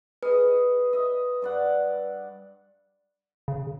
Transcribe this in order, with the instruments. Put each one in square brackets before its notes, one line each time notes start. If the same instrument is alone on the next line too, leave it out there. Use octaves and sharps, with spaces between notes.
[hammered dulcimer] G#4 D#5 [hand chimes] B4
[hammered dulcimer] D#5 E5
G2 D5 F#5
[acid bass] C#3